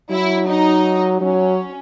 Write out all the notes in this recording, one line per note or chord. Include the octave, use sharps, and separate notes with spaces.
F#3 E4
D#4
F#3 C#4